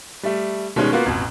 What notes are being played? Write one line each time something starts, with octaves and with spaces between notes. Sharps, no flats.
G3 A3
B2 D#3 G3 G#3 C#4
A#3 B3 F4 F#4
A1 F2 B2